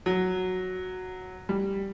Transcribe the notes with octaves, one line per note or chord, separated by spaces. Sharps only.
F#3
G3